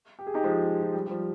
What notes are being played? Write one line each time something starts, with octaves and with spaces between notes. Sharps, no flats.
G4
G#4
D#4 G4
F3 G#3
F3
G3
G3
F3